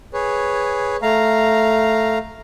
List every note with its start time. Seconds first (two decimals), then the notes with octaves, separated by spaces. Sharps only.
0.14 G#4 B4 C#5
1.02 A3 F5 A#5